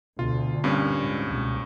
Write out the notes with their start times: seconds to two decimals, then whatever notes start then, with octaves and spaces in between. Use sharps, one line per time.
0.19 D2 B2 F4 F5
0.64 G2 A#2 C4 C#4
0.98 G#2
1.30 C#2 B2